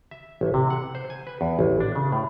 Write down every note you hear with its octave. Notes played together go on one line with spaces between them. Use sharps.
E5
A1
C3
F#5
C5
G#5
B4
E2
A1
D4
C#3
A2